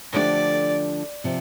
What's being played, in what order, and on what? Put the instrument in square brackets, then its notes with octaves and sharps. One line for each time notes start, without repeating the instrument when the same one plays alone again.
[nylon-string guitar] D3 F3 A3 D4 G4 [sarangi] D5
[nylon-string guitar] C3 F3